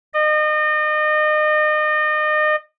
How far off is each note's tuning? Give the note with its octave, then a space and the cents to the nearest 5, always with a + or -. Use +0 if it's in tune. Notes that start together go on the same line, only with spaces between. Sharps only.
D#5 -35